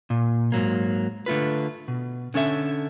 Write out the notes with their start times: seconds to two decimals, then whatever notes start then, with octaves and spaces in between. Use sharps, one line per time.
0.10 A#2
0.52 G#2 F#3 A#3
1.26 D3 A3 F4 B4
1.88 B2
2.34 D3 C#4 A4 E5